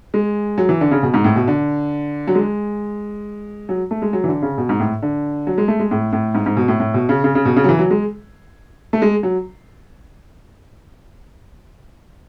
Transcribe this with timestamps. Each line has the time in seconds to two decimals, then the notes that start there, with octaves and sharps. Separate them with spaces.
0.14 G#3
0.58 F#3
0.69 E3
0.81 D3
0.91 C#3
1.03 B2
1.14 G#2
1.24 A2
1.36 B2
1.48 D3
2.27 F#3
2.35 G#3
3.69 F#3
3.91 A3
4.02 G#3
4.13 F#3
4.24 E3
4.28 D3
4.42 C#3
4.58 B2
4.69 G#2
4.80 A2
5.02 D3
5.47 F#3
5.58 G#3
5.68 A3
5.80 G#3
5.91 A2
6.13 A2
6.35 G#2
6.46 G#2
6.57 B2
6.68 A2
6.80 A2
6.94 B2
7.09 C#3
7.24 C#3
7.35 C#3
7.45 B2
7.56 C#3
7.64 F#3
7.69 E3
7.79 F#3
7.91 G#3
8.93 A3
9.02 G#3
9.23 F#3